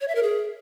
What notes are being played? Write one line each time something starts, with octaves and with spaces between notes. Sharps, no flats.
C#5
E5
A#4
G#4